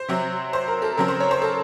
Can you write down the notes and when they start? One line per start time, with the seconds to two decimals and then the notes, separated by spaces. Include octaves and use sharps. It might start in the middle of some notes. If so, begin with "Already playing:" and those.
Already playing: C5
0.08 C3 F#3 C4
0.53 C5
0.68 A#4
0.82 A4
0.97 C#3 F#3 C4 A#4
1.08 C5
1.20 C#5
1.31 C5
1.42 A4